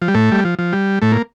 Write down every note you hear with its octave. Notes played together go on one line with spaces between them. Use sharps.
F3
G3
A2 A3
G3
F3
F3
G3
A2 A3
A#3